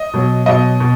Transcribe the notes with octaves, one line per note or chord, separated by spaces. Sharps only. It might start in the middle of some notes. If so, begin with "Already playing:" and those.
Already playing: D#5
B2 F#3
B2 F#3 D#5
B2